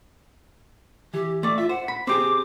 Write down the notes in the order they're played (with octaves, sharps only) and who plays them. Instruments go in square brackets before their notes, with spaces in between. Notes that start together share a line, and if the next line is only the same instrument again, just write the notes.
[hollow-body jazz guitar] E3 [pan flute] G4
[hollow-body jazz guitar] A3 D5 [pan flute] D6
[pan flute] F4 [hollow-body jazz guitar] E5
[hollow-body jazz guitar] C5 [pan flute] F#5
[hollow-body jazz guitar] B5
[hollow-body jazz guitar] C4 G4 G#4 [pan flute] D6